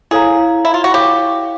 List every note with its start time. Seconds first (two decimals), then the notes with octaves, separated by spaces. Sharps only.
0.11 E4 G#4 A4 C#5 F5 A#5
0.65 E4
0.74 F4
0.84 F#4
0.94 E4 G4 A4 C#5 F5